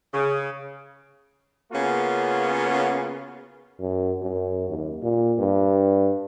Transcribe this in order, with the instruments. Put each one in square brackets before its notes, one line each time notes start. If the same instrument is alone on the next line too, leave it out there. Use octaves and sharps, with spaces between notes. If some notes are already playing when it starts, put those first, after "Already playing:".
[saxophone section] C#3
[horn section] C#3 A#3 B3 C#4 F4 F#4
[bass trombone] F#2
F#2
D#2
A#2
G2